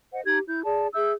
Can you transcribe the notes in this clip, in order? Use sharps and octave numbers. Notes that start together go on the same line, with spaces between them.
C5 D#5 F#5
D#4 G4 G#6
E4 G6
G#4 D5 A5
G#4 E5 E6 G6